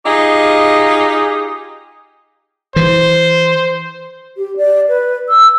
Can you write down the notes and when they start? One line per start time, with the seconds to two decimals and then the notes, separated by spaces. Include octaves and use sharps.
0.05 D#4 F4 G4 G#4 D#5
2.76 E3 C5
4.37 G4
4.57 D5
4.89 B4
5.29 E6